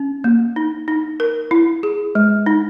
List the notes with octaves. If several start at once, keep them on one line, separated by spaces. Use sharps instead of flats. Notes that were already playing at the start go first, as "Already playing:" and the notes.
Already playing: C#4
A#3
D#4
D#4
A#4
E4
G#4
G#3
D#4